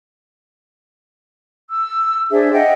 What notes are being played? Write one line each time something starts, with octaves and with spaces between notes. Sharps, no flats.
E6
D4 G#4 C5 E5
D#5 E5 F#5 G5